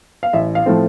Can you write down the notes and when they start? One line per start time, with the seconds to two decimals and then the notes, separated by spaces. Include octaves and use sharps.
0.23 F5
0.33 A1 E5
0.55 F5
0.66 A2 F3 A3 C4